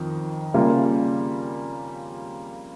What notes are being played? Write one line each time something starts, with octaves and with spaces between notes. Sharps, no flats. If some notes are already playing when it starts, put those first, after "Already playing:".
Already playing: F2 D#3
C#3 G3 A#3 F4